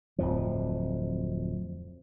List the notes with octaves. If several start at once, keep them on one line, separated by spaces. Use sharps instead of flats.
D1 F2 F3